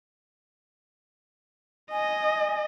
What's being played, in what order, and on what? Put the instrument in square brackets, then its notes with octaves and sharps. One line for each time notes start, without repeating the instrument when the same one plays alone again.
[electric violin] D#5 [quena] G#5